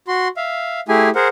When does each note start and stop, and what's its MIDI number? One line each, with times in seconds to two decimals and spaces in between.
0.08 0.28 66
0.08 0.28 84
0.37 0.80 76
0.37 0.80 77
0.88 1.09 57
0.88 1.09 64
0.88 1.09 67
0.88 1.09 68
0.88 1.09 80
1.15 1.28 68
1.15 1.28 70
1.15 1.28 72
1.15 1.28 78